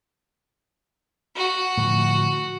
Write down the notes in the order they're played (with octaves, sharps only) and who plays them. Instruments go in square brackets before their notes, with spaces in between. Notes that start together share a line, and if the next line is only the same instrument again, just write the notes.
[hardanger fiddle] F#4
[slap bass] A2 D3 F3